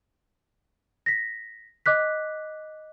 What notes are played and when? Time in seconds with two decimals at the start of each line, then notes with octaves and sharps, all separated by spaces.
1.06 A#6 B6
1.86 D#5 D6 F#6 B6